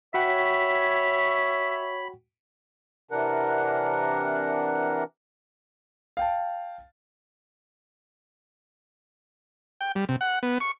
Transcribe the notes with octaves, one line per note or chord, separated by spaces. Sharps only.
F#4 C#5 E5 F#5 G5 B5
C3 E3 D4 A#4 F#5
F5 G5 A5
G5
G3
C3
F#5
B3
C#6